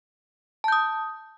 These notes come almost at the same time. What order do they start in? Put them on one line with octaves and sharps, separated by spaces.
A5 G6 D#6